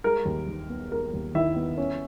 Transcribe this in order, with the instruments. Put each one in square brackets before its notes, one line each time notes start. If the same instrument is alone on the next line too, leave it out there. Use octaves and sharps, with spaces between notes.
[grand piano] G#3 A#4
D#2
D#3
B3
G#3 A#4
D#2
D#3 E4 E5
B3
C#4